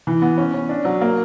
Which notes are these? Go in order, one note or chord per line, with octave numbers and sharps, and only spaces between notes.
E3
B3
C#4
C#4
D4
F#3
A#3